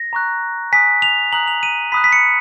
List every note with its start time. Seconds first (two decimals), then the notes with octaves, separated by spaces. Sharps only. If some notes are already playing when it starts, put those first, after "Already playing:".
Already playing: A#6
0.13 A#5 C#6 F#6
0.72 G#5 D#6 F#6 B6
1.02 F7
1.33 A#5 D#6 F#6 F#7
1.48 F7
1.63 D#7
1.92 B5 D#6 F#6 B6
2.04 B6
2.12 C#7